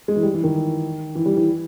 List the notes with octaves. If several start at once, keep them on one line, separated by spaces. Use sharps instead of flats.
G#3
E3
G3
E3
D#3
E3
G3
E3